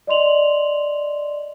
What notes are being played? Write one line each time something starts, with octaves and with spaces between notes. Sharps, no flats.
D5 D#5 C6 F7 F#7